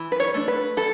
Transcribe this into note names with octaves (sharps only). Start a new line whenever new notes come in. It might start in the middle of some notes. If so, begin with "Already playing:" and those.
Already playing: E3
B4
C#5
A3 D4
B4
E3 A4